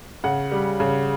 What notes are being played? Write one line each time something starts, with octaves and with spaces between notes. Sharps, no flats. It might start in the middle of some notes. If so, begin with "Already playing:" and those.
C#3 F#5
G3
C#3